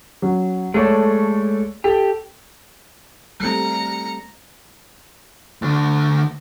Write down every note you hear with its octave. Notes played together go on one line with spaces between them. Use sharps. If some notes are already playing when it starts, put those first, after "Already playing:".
F#3 C#4
G#3 A3 A4 C#5 D5
G4 A4
G3 A3 C4 A#5 C#7
D2 D3